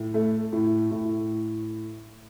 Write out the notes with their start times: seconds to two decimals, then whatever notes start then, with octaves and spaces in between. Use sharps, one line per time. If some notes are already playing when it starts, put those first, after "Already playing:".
Already playing: A2
0.14 A3
0.52 A2
0.91 A2